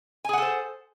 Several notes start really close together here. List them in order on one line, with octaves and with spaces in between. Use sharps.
G#5 G#4 F#5 A4 C5